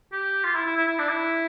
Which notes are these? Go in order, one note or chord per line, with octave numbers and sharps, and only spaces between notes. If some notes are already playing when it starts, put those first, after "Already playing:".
G4
F4
E4
E4
E4
E4
D4
E4